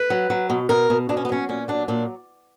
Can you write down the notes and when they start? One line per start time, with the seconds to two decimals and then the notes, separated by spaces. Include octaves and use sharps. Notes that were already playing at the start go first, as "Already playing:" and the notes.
Already playing: B4
0.10 F#3
0.30 F#3
0.50 B2
0.69 B2 A#4
0.90 B2
1.09 B2 D4
1.17 C#4
1.25 B3
1.29 F#3 C#4
1.49 A#2 C#4
1.68 F#3 D4
1.88 A#2 D4